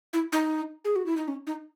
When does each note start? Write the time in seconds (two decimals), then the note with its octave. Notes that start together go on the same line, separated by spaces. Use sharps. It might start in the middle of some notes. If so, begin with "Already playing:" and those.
0.13 E4
0.32 D#4
0.85 G#4
0.96 F#4
1.06 E4
1.17 D#4
1.28 C#4
1.47 D#4